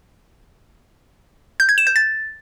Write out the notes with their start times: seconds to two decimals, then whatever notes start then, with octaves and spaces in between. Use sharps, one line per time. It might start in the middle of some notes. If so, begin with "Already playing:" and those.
1.60 G6
1.69 G#6
1.78 E7
1.87 G6
1.96 A6